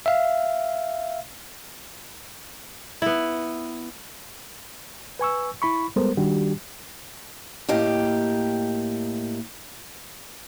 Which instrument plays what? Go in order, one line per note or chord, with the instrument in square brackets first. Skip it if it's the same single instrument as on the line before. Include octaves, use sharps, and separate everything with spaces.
[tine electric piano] E5 F5
[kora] B3 E4
[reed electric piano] B4 G#5 C#6 E6
E4 B5 C#6
G3 G#3 B3 A4 A#4 C5
D#3 G3 D4 F#4 G4
[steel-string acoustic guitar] A2 A#3 G4 D#5